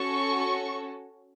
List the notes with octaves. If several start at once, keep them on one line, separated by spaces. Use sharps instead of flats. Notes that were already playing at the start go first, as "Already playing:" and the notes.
Already playing: C#4 F#4 A4 C#6